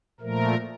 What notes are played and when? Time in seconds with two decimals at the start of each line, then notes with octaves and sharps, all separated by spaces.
0.20 A#2 F3 A3 A#4